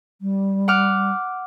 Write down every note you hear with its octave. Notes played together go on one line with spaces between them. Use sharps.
G3
F#5 D6 F6